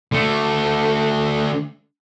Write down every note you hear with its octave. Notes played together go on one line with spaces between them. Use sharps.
D3 A3